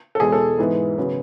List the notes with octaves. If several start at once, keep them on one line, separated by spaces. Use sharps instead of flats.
A4
E1 E2 B2 G#3 G#4
A4
G#2 E3 G#3 B3
C#3 F#3 B3